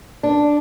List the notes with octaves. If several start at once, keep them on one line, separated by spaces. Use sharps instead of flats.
D4